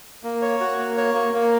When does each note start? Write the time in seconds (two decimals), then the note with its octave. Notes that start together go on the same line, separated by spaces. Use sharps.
0.24 A#3
0.42 C#5
0.60 F#4
0.78 A#3
0.97 C#5
1.15 A#3
1.34 A#3